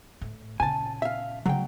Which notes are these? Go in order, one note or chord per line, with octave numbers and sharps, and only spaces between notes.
A2
A#2 C#3 G#5 A5
E5 F5
C#3 F#3 A3 G5